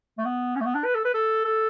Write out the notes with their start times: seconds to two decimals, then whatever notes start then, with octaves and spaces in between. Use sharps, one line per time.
0.18 A3
0.25 B3
0.56 C#4
0.61 A3
0.65 B3
0.75 D4
0.84 B4
0.95 A4
1.05 B4
1.14 A4
1.45 A4